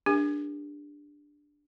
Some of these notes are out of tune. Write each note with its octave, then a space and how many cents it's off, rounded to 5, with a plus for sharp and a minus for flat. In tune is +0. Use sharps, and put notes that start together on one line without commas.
D4 +0 G4 +40 A#4 +0